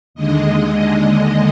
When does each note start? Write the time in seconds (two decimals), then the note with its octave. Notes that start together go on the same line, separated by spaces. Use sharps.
0.14 D#2 D3 G#3 D#5